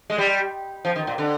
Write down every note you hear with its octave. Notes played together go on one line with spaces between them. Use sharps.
G#3
G3
F3
D#3
A#2
D3